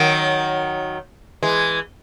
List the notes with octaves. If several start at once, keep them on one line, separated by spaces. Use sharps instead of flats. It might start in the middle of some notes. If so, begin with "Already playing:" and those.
Already playing: D#3 F#3
E3 G#3